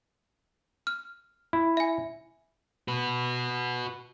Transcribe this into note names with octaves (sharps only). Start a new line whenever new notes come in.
F6
E4
E5 G#5
F#4 B4